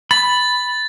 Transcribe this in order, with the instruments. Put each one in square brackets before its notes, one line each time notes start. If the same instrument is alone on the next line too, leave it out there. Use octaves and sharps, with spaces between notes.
[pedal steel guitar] B5 [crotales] A6